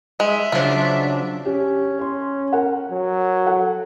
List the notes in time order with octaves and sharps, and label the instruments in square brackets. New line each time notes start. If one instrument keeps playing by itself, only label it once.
[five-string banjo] G#3 [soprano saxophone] E5
[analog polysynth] C#3 F#3 D4 [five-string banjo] F3 F4
[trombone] C#4 [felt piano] G4
[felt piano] C#5 C6
A#4 F#5
[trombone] F#3
[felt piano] A4 F#5